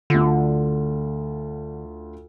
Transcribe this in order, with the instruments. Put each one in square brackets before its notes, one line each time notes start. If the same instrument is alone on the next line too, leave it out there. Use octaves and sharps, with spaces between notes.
[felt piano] D2 F4 [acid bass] D3